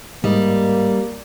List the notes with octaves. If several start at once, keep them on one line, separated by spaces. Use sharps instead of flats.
G#2 G3 A#3 D#5